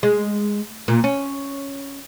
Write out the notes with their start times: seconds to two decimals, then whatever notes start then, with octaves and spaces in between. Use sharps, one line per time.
0.03 G#3
0.88 A#2
1.04 C#4